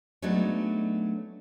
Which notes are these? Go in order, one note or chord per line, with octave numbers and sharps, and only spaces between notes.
F#3 G#3 A3 B3 D4 D#4